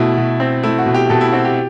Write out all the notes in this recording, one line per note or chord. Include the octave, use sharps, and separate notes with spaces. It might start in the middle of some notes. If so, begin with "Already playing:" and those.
Already playing: B2 A3 E4
B2
C4
A3 E4
F#4
B2
G4
B2 A4
E4
C4 F#4
G4